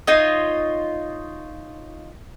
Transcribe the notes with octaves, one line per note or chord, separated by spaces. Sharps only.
D#4 F4 C#5 D#5